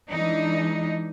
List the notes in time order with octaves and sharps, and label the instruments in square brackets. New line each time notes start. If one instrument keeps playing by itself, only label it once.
[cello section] E3 G#3 D4 D#4